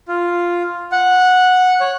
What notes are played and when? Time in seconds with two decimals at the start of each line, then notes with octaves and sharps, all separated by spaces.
0.08 F4
0.92 F#5
1.81 C#5